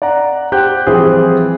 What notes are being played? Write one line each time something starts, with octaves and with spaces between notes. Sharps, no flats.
D5 F#5 A#5
G4 C5 F#5 G5 F#6 G6
E3 F3 G3 C4 G4 G#4